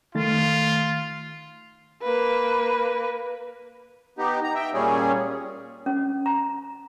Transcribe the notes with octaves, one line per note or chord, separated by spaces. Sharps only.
D#3 A3 F4 A6
A#3 B4
B3 D#4 G4
A#5
E5 G5
A#2 G3 C#4 G#4
C#4
A#5